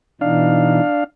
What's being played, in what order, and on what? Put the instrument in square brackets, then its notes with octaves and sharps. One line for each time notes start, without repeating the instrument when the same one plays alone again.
[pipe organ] B2 E3 D#4 [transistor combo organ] D4 F5